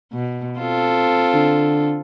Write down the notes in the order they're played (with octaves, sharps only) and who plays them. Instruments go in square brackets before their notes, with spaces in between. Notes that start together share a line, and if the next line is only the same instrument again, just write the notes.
[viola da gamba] B2
C4 F4 A4
[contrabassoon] D3